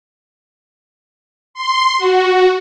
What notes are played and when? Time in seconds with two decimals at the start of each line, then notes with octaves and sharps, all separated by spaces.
1.54 C6
1.98 F#4